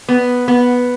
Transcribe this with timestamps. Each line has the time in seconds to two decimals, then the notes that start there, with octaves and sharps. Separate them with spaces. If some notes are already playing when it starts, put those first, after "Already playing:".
0.09 B3
0.48 B3